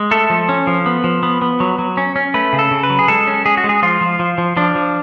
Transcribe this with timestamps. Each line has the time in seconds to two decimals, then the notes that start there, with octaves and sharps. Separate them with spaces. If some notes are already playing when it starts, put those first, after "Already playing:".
Already playing: G#3
0.11 A3 A4
0.30 F3
0.49 C#4
0.67 F3
0.86 B3
1.04 F3
1.23 B3
1.42 B3
1.60 F#3
1.79 F#3
1.97 C#4
2.16 C#4
2.34 A3 B4
2.53 C#3
2.59 A4
2.71 C#3
2.83 B4
2.90 F#3
2.99 G#4
3.08 G#3 A4
3.27 C#4
3.46 G#3 G#4
3.57 F#4
3.64 G#3
3.69 G#4
3.82 F3 F4
4.01 F3
4.19 F3
4.38 F3
4.57 F3 D4
4.75 F3